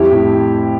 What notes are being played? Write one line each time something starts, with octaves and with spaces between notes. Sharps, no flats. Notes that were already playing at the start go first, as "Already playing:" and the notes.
Already playing: F2 G3 E4 G4
A2